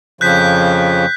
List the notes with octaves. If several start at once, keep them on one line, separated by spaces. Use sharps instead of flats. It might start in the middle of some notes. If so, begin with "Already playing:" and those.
F2 C#3 F3 F#6 G6 B6